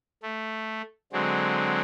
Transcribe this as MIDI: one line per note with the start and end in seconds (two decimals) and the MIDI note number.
0.23 0.82 57
1.12 1.82 50
1.12 1.82 54
1.12 1.82 56
1.12 1.82 60